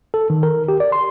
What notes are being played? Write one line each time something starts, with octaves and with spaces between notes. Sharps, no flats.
A4
D#3
A#4
G4
D5
C6